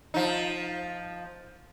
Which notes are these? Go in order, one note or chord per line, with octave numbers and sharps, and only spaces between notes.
F3 D#4